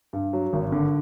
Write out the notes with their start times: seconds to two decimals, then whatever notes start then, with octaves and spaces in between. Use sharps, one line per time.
0.13 G2
0.33 F#3
0.53 G#1
0.72 D3